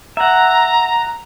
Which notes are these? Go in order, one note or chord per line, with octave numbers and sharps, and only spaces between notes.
E5 F#5 A#5